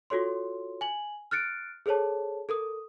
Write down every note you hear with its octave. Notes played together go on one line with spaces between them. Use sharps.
F4 F#4 A4 C#5 C6
G#5 F#7
F6 F#6 A6 C#7 D7
G#4 A4 C5 C#5 A5
A4 A#4 D#6